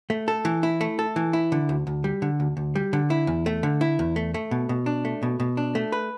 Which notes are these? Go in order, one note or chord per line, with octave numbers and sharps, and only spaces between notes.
A3
A4
E3
E4
A3
A4
E3
E4
D3
D2
D2
G3
D3
D2
D2
G3
D3
E4
E2
A3
D3
E4
E2
A3
A3
B2
B2
D4
A3
B2
B2
D4
A3
B4